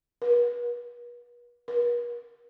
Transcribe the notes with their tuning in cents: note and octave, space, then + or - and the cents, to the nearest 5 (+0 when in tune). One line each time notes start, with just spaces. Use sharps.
B4 -40
B4 -45